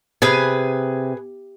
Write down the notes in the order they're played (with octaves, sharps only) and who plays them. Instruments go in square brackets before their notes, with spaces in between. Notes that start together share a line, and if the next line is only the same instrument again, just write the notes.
[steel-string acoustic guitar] C3 [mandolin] G#4 B4 G#5